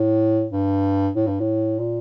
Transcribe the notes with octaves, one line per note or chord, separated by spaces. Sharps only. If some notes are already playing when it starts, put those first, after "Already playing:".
Already playing: A2
G2
A2
G2
A2
A#2